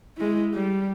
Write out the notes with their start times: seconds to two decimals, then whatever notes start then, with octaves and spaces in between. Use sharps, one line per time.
0.17 G#3 E4
0.54 G3